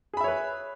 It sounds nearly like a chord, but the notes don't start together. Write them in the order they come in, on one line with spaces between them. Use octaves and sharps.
G#4 B5 E5 C#5 B4